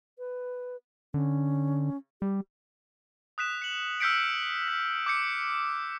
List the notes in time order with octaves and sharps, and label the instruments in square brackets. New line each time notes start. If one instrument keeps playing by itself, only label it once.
[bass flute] B4
[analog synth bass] D3 [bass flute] C#4
[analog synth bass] G3 [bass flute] G4
[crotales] D#6 F#6 B6 E7
C#7 F#7
E6 F6 G6 B6 C#7 D7
B6
D6 G6 C#7